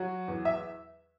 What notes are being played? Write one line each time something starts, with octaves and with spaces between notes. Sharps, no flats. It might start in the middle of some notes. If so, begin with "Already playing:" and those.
Already playing: F#3 F#4
E2
E5